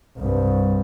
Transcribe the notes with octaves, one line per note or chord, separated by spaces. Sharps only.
C2 G2